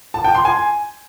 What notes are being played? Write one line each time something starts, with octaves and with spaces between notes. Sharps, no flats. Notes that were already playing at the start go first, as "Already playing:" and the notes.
A5
G5
C6
G#5